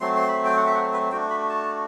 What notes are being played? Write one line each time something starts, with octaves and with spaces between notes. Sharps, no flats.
F#3 A3 C4 C6
C6
B5
G5
F#5
E5
F#5
B4
A3 D4 F#4 G5
B5
A5